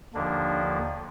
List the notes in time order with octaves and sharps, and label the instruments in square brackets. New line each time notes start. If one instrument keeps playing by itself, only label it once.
[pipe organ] D#2 D3 F3 A#3 D4